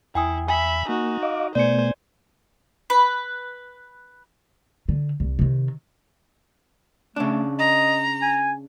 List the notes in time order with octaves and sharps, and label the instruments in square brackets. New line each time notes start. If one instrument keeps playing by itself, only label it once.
[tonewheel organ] E2 [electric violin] E4 [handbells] G5 G#5 D#6
[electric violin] E5 B5 [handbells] G#5
[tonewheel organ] A#3 [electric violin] D#4 F#4
[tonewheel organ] D#5 F5 D6
[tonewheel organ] B2 A3 B3 [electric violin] C5 G#5 [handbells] D5 C#7
[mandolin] B4
[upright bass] D3
C2
C3 D#3
[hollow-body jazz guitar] C#3 D4 [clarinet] A3
[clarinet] D#5 [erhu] A#5
[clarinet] G#5